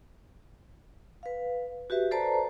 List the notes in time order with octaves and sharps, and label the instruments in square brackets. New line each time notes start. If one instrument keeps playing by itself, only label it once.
[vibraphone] B4 F5
F#4 G4 B4 E5
A4 B4 C5 D5 A5 A#5